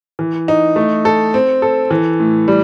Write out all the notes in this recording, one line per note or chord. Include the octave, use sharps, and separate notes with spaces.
E3
D#4
A3
A4
C4
A4
E3
A2
G3